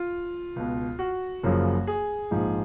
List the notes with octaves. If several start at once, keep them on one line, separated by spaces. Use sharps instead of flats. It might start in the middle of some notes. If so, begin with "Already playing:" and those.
Already playing: F4
C#2 B2
F#4
F#1 F#2 C#3 F3
G#4
A#1 G#2 F3